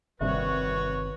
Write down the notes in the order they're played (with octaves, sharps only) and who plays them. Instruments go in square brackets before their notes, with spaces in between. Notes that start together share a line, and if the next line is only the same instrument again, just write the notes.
[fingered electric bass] G1 D#3 C4 [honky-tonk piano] C2 E5 [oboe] F#4 [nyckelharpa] B4 C#5